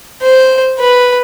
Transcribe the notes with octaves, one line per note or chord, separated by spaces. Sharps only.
C5
B4